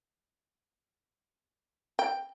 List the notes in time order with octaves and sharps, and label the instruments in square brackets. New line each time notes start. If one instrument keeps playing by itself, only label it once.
[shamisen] G5